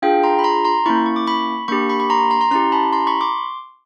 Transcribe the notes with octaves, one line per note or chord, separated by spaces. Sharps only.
D4 F4 G#4 F5 G5
A#5 C6
B5
A#5 C6
A#5 C6
A#3 C#4 E4 B5 C#6
C#6
D6
B5 C#6
A#3 D4 G4 B5 C#6
B5 C#6
B5 C#6
A#5 C6
A#5 C6
A#5 C6
C#4 E4 G4 A#5 C6
A5 B5
A#5 C6
B5 C#6
C6 D6